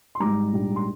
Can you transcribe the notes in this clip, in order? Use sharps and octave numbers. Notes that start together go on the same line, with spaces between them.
C6
G#1 G#2 G3 A#5 D6
A#1 G#2 G3
C6